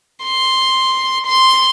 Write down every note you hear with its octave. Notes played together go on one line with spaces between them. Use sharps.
C6
C6